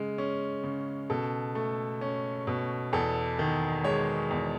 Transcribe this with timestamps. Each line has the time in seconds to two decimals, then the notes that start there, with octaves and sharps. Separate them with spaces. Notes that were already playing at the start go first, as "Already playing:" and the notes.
Already playing: C#3 G#3
0.18 C#4
0.64 C#3
1.10 B2 A4
1.55 A3
2.01 C#4
2.47 B2
2.93 E2 A4
3.39 D#3
3.84 G#3 C#5
4.31 E2